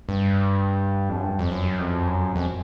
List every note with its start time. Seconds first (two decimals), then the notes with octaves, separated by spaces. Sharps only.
0.09 G2
1.09 F2
1.16 F#2
1.23 G2
1.39 F2
1.51 F#2
1.79 F2
2.07 F#2
2.36 F2